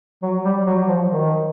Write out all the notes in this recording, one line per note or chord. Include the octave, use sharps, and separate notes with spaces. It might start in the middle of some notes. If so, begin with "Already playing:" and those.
F#3
G3
F#3
F3
D#3